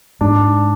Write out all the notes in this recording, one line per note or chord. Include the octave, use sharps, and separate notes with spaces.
G#2 D4